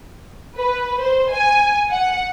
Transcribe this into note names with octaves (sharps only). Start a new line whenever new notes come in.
B4
C5
G#5
F#5